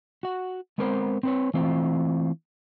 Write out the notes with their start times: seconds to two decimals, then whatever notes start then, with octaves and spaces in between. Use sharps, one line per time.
0.23 F#4 F#5
0.78 G#3 B3 C4 A#4 C5
1.23 C4 B4 C#5
1.54 E3 A3 C4 F4